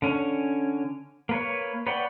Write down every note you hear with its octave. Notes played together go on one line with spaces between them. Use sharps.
D3 C#4
A#3 B4 C#5
B4 C#5 D5 F#5 G5